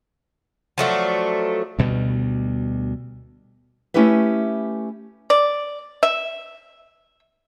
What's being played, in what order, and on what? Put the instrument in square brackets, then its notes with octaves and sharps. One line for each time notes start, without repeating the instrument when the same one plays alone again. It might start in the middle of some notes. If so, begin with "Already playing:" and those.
[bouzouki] F3 F#3 A3 D4
[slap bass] D2 B2 G3
[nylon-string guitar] A3 C#4 E4 G4 B4 E5
[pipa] D5
E5